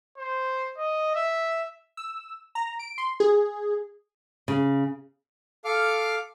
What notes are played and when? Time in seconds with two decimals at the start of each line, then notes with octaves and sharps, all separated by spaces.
0.17 C5
0.77 D#5
1.15 E5
1.97 E6
2.55 A#5
2.79 D7
2.98 C6
3.20 G#4
4.48 C#3
5.65 A4 F5 D6 F6